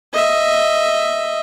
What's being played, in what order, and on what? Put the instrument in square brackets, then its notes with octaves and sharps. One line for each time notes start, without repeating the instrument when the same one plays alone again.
[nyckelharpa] D#5 E5